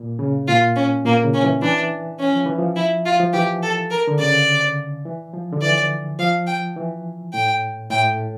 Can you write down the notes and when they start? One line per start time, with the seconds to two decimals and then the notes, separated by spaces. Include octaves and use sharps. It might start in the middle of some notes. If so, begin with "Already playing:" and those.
Already playing: A#2
0.19 C#3
0.48 A#2 F4
0.76 C#4
1.05 A#2 A#3
1.24 C#3
1.34 C#4
1.43 E3
1.62 E3 D4
2.20 C#4
2.33 F3
2.46 E3
2.58 F3
2.76 E4
3.06 F4
3.20 F3
3.33 E3 G4
3.62 A4
3.91 A#4
4.07 D3
4.19 C#3 D5
5.05 E3
5.33 F3
5.52 D3
5.62 E3 D5
6.19 F3 F5
6.47 G5
6.76 E3
7.33 A2 G5
7.90 A2 G5